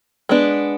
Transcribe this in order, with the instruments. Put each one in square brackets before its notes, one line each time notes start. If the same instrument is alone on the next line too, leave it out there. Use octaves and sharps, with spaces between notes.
[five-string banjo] G#3 B3 D4